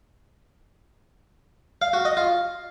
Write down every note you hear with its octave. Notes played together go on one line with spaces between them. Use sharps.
F5
F#4
D#5
F4